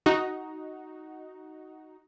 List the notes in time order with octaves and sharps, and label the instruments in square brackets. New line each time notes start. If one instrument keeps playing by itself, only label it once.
[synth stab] D#4 F#4